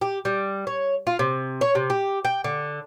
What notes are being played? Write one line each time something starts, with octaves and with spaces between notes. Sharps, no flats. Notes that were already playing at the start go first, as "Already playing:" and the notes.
G4
G3
C#5
F4
C3
C#5
C3
G4
G5
D3